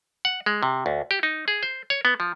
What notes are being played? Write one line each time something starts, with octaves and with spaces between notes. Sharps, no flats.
F#5
G#3
C3
D2
G4
D#4
G#4
C5
C#5
B3
F3